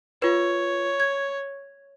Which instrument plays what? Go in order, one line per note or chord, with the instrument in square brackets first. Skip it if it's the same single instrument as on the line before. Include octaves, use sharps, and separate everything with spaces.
[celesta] F4 B4 [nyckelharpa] C#5
[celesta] G#6